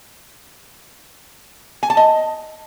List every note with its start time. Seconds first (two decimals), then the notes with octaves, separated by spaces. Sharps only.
1.83 G#5
1.90 A5
1.97 D#5